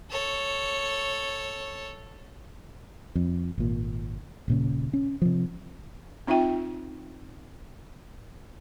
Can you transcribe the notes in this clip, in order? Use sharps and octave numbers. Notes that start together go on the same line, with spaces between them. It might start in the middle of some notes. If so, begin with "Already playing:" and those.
A4 C#5
F2
G#1 A#2
D#1 A#2 C#3
C#4
C3 F3
C4 D#4 F4 E5 G5